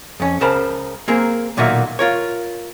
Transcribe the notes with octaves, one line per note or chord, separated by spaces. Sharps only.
F2 C#4
C#2 C#3 A#4 C5 A5 B5
A#3 C4 G#4 A#4
B1 A#2 D#3 A#3 F#4 E5
F4 A#4 C#5